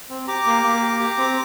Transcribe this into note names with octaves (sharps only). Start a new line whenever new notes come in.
C4
G4 A#5 D6
A#3
A#3
G4
G4
C4